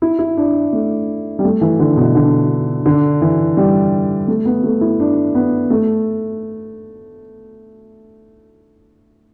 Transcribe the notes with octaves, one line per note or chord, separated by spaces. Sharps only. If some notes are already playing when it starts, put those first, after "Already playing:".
E4
E4
D4
A3
G3
A3
E3
D3
B2
D3
D3
E3
G3
A3
B3
A3
E4
D4
B3
A3